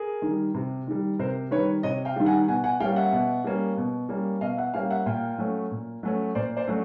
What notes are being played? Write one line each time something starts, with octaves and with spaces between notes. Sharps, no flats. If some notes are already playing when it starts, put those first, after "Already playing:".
Already playing: G#4 A#4
D#3 G3
C3
D#3 G3
C3 A#4 C5
D#3 G3 B4 C#5
C3 C#5 D#5
F5 G5
D#3 G3
F#5 G#5
B2 F#5 G#5
F#5 G#5
G3 A#3 C#4 F5 G5
E5 F#5
B2
G3 A#3 C#4
B2
G3 A#3 C#4
B2 D#5 F5
E5 F#5
G3 A#3 C#4 F5 G5
E5 F#5
A#2 F5 G5
F#3 A3 C#4
A#2
F#3 A3 C#4
A#2 C5 D5
C5 D5
F#3 A3 C#4